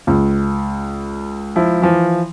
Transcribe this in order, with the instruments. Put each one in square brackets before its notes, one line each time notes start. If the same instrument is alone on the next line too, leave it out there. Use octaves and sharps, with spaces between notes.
[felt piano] C#2
[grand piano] F3 E4
E3 F3